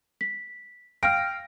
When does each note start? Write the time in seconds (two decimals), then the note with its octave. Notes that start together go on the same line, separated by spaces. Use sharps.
0.21 B6
1.03 F5 G5 F6 A#6 D7